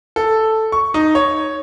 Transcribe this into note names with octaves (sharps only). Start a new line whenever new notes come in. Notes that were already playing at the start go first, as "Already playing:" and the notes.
A4
C#6
D#4
C#5